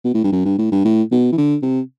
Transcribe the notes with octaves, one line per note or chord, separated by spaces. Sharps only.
B2
A2
G2
F#2
G2
A2
G2
A2
B2
E3
D3
C3